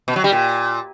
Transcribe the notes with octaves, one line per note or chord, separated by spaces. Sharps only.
B2
F#3
G3
A#2